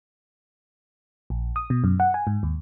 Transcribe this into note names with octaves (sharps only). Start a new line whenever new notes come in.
A#1
D#6
B2
F#2
F#5
G#5
G#2
D#2